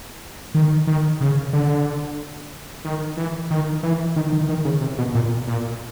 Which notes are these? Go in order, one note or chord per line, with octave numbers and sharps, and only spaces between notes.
D#3
D#3
C#3
D3
D#3
E3
D#3
E3
D#3
D#3
D#3
C#3
C3
B2
A#2
A#2